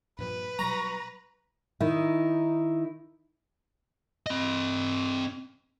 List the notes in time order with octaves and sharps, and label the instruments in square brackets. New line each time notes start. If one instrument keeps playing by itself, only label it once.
[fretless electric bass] G2 A#2 F3 [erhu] B4
[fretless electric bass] B2 F#3 G3 [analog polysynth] A#5 [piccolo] C#6
[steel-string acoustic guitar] D#3 D#4 E4
[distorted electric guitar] C4 D#5